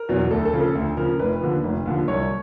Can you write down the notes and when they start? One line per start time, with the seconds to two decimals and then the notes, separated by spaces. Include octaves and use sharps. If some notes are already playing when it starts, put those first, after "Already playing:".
Already playing: A#4
0.09 E2 B2 F#3
0.31 D2 A4
0.45 A4
0.53 C#3 F3
0.60 A4
0.75 D2
0.97 C#3 F3 A#4
1.19 F1 B4
1.41 D#2 D3 F3
1.64 F1
1.86 D#2 D3 F3
2.08 C2 C#5